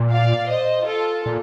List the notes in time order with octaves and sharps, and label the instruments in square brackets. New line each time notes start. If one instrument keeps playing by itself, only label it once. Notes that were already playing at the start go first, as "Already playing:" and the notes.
Already playing: [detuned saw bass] A#2
[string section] D5 F5
C5 D#5
F4 A4
[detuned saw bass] A#2